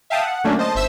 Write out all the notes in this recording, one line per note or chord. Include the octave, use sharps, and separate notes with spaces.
E5 F5 G5 A5 D#6
F#5
D3 F#3 A3 A#3 C#4 D4
C5 D#5 A5
G1 C5 E5 E6